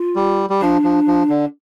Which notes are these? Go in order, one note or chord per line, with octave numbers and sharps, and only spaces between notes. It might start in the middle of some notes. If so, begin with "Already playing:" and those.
Already playing: F4
G3
G3
F3 D4
F3
F3
D3